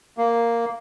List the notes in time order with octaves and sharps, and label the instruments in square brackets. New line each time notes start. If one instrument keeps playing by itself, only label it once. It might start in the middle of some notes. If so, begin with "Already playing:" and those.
[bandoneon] A#3